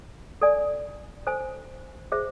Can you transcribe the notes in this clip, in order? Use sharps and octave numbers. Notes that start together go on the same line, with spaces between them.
A4 D5 G#5
A4 C5 G#5
G#4 C5 E5